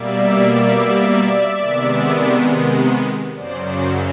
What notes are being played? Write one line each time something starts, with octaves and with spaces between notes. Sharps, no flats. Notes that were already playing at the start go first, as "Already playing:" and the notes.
Already playing: B2 G3 A#3 D5 E5
C3 D#3 G#3 B3
F#2 C#3 F#3 C5 D5
C5 D5